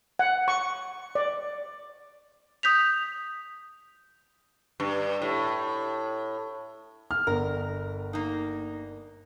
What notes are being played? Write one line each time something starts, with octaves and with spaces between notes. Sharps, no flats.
F#5
C#6
D5
D#6 G6 B6 F7
G2
A2
F6
G1 A#4
A#3 D#4